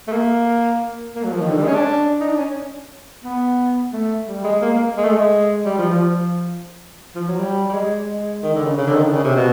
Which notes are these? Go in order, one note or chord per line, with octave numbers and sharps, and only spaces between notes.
A3
A#3
A#3
F#3
F3
D#3
D3
G3
G#3
C#4
D4
D#4
D4
C#4
B3
A3
G3
G#3
A#3
A#3
G#3
A3
G#3
G3
F3
F3
F3
F#3
G3
G3
G#3
G#3
D#3
D3
C#3
C#3
D3
D#3
D3
C#3
C3
B2